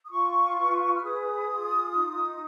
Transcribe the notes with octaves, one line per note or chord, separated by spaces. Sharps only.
D#6
F4 C#6
B4
F6
G#4 D#6
F4
D#4